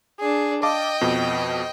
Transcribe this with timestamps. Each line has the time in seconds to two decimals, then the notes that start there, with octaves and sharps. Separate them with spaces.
0.19 D4 G#4
0.63 D#5 F5 G5 A5 D6
1.01 F2 B2